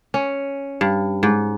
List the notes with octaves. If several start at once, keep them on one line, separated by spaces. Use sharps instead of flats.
C#4
G2
G#2